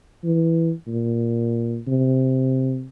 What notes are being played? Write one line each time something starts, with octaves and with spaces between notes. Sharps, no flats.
E3
A#2
C3